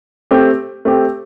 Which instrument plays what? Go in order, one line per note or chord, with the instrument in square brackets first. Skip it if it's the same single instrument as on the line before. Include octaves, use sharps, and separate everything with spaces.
[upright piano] A3 C4 G4
A3 C4 G4